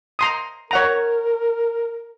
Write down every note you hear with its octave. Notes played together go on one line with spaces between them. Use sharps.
A#5 C6 D#6
A#4 C#5 F#5 A#5